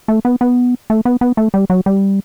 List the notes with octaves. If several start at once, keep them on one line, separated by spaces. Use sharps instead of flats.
A3
B3
B3
A3
B3
B3
A3
G3
F#3
G3